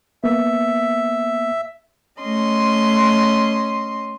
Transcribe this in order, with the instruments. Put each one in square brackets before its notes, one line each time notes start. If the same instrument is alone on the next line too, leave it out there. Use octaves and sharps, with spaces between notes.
[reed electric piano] A#3 B3 [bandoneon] E5
[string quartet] A3 C#4 D#5 C6